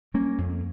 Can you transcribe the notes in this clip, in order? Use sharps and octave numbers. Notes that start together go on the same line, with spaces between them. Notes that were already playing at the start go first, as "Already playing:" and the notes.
G3 A#3 C#4
F2